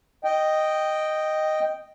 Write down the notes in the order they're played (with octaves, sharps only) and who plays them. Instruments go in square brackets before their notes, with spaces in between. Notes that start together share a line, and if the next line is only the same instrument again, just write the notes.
[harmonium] D#5 G5